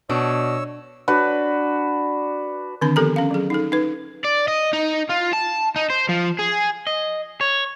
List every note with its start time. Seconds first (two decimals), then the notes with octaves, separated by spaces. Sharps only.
0.10 B2 D4 C#5 E6
1.08 D4 F#4 B4
2.81 D3 D#3 C4 D4 B5
2.96 F3 B3 G4 A4 A#4 A#5
3.16 C#4 F5
3.31 F#3 G#4
3.50 D#4 A4
3.72 D#4 B4
4.24 D5
4.48 D#5
4.73 D#4
5.09 F4
5.33 A5
5.76 D#4
5.90 C5
6.09 F3
6.39 G#4
6.87 D#5
7.41 C#5